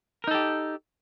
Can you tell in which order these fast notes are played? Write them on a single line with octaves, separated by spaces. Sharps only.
A#4 D#4 A4 G4